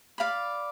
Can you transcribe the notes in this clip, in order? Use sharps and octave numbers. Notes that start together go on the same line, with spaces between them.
D5 F5 B5